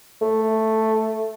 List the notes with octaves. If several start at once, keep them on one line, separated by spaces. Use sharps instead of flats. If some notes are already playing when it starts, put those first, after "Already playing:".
A3